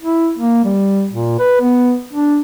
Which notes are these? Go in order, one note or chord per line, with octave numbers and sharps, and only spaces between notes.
E4
A#3
G3
A#2
B4
B3
D4